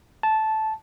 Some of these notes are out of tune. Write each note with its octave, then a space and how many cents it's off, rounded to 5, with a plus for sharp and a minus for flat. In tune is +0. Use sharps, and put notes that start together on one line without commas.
A5 -10